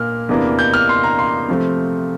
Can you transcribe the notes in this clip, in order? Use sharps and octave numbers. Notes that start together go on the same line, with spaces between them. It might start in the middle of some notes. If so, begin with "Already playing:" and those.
Already playing: A#2 A#3 F6
E2 C3 E3 A#3 D4
G6
F6
C6
A#5
C6
C3 F3 A3 C4